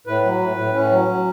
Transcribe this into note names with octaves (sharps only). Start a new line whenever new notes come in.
A2 B4
F#3
A2
A2
A2 C#4
F#3
F#3